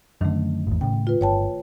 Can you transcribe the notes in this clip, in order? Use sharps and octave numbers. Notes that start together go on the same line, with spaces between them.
F#2 D3 D#3 A3
G#1 E2
A2 C#3 G5
F4 B4
G1 C#5 G5 A5